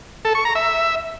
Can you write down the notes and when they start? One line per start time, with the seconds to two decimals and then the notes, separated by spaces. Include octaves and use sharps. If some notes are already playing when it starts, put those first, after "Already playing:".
0.25 A4
0.35 C#6
0.45 A#5
0.55 E5